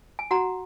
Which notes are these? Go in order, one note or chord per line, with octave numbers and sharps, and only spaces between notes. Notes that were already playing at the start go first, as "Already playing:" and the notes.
G#5
F#4 F#5 A#5